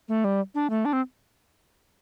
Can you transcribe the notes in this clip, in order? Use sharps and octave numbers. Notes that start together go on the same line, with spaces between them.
A3
G3
D4
A3
D4
C4